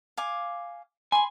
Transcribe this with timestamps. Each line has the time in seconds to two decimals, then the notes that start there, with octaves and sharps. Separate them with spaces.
0.17 F5 G#5 D6
1.12 G#5 B5 C6